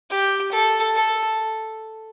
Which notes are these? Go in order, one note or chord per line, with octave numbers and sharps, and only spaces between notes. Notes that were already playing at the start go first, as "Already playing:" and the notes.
G4
A4
A4